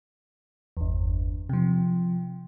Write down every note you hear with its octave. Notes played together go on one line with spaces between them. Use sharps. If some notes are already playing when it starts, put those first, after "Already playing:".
G1 E2
C3 F3